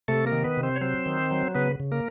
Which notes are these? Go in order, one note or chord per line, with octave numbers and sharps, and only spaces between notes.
C3 A3 A4
A#3 A#4
D#3
B3 B4
C3
C4 C5
C#5
F#3 C4 C5
D#3
F#3
C#3 B3 B4
C#3
A#3 A#4